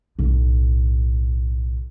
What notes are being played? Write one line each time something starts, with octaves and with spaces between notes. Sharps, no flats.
B1 A2